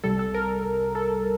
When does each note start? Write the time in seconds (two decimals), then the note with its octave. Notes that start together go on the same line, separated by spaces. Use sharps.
0.04 C2 C3 G3 A4
0.19 A4
0.34 A#4
0.95 A4